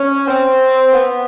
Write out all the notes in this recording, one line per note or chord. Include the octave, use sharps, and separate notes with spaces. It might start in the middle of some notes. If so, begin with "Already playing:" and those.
Already playing: C#4
C4
B3